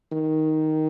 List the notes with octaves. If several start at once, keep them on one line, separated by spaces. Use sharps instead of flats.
D#3